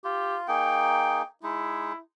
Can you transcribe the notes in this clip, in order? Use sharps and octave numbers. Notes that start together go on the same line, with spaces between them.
F4 G4
A#3 D#4 G#4 G5
G#3 D#4 E4